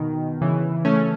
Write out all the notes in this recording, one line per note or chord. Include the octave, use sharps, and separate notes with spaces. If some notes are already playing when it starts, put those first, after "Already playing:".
Already playing: B2 D#3
C#3 E3
A3 C#4